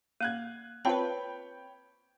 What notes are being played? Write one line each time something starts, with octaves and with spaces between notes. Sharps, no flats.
A#3 F5 F#6 G#6
C4 F4 B4 C#5 G5 A5 B5